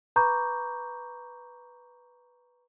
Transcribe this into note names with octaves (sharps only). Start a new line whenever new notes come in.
B4 A#5 B5 C#6 D6 G6